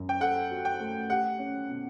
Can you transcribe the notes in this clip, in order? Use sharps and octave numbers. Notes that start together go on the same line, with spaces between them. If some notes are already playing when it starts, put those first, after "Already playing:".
Already playing: F#2
G5
A4 F#5
F#4
G5
A3
G4 F#5
C#4
B2